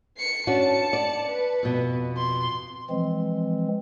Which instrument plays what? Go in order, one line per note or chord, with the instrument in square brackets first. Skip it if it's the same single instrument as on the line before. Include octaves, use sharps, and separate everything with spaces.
[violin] C7 C#7
[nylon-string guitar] C#4 D4 F#4 [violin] A5 C#7
[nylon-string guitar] D5
[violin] B4
[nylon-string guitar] F2 B2
[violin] C6
[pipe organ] E3 F3 G#3 C4